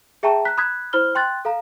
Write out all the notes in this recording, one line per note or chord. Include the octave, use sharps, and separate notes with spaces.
G#4 E5 G5 A5 A#5 C#6
A#5 F#6 B6
B5 D#6 F#6 G#6 B6
E4 C5 B5 F6 G7
G5 C6 F#6 A6
A4 F5 A#5